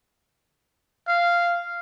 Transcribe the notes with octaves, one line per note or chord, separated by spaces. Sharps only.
F5